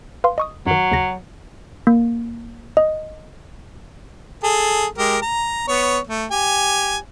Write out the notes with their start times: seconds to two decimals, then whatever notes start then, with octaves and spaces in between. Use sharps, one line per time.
0.24 B4 F5 C6
0.38 D#5 C#6 D#6
0.67 F#2 D#3 F#3
0.92 D#2 C#3 A#6
1.87 A#3
2.77 D#5
4.43 G#4 A4
4.98 G#3 G4 A#4
5.22 A#5
5.68 B3 C#5
6.07 A3
6.31 G4 G#5